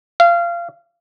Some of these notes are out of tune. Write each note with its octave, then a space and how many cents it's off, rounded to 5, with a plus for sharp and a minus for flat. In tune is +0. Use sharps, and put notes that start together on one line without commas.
F5 -25